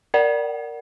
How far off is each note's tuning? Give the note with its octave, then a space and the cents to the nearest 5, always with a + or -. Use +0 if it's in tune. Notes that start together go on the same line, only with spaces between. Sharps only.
A#4 +0 D5 +0 F#5 +15